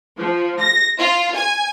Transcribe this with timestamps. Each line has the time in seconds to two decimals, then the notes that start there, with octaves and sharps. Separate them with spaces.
0.19 F3
0.61 A#6
0.98 F4
1.35 G#5